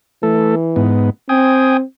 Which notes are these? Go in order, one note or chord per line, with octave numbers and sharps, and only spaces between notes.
E3 A3 A4
G#2 B3
C4 G5 G#5 D#6